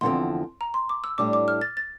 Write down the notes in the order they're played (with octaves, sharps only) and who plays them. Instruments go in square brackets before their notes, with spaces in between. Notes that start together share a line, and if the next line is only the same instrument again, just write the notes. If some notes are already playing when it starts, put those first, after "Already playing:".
[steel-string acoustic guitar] E2 D3 F3 C4 [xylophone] C6
[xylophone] A#5
C6
D6
E6
[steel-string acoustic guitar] A2 G3 D4 [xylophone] D6
[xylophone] D6
F6
A6
A6